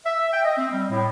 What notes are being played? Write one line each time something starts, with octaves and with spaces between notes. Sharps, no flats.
E5
G5
D#5
C4
G3
A2